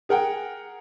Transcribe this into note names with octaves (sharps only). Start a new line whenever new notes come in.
G#4 A#4 F#5 G5